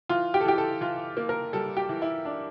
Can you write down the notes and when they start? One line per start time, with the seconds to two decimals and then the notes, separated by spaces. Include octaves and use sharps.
0.09 E3 F4
0.34 G4
0.41 A4
0.45 E3 G4
0.58 A4
0.81 E3 F4
1.17 A#3
1.29 A#4
1.53 G3 A4
1.77 G4
1.89 E3
2.02 E4
2.25 D4